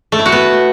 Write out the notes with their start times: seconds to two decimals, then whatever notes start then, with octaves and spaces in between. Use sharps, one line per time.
0.12 A3
0.19 E4
0.26 F#4
0.32 B3